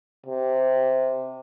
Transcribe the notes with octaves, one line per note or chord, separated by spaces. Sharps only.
C3